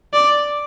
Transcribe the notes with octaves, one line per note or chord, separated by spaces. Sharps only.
D5